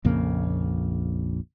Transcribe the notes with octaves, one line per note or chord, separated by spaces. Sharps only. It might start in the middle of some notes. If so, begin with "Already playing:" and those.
A#1 F2 C#3 A#3